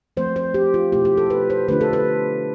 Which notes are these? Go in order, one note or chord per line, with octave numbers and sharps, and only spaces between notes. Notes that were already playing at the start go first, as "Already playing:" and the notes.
F3 A3 C4 C5
C5
G4
F4
B2 A3 E4 G4
G4
A4
B4
C5
D3 A3 D4 F4 B4
A4
B4